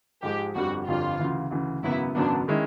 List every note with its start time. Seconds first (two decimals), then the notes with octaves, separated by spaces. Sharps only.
0.23 G#2 F3 G#3 G4
0.55 G1 F2 D3 G3 F#4
0.88 G1 F2 D3 G3 F4
1.19 D2 C#3 E3
1.51 D2 C#3 E3
1.83 G#1 F#2 C#3 F#3 B3 E4
2.15 G#1 F#2 C#3 F#3 B3 D4
2.48 D#3 G#3 C#4 E4